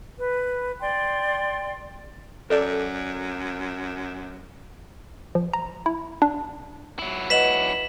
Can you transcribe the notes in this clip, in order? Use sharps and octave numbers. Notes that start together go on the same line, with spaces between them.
B4
D5 G5 C6
F#2 A4 D5
F3
A#5
E4
D4
F#3 E4
B4 D#5 F#5 B6 E7 F#7